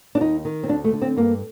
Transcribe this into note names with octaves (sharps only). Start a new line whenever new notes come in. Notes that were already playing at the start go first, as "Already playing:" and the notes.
D4
D#2 D#4
D#3
C4
D2 D4
A3
D3
C4
G2 A#3